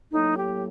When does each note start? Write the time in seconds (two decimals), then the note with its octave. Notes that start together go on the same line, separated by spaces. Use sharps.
0.11 A2 F#3 A#3 D#4
0.37 G4